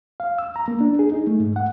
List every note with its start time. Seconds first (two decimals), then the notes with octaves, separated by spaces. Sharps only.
0.20 F5
0.38 E6
0.56 A#5
0.68 A#3
0.81 D4
0.99 G#4
1.12 D#4
1.27 A3
1.40 G#2
1.56 F#5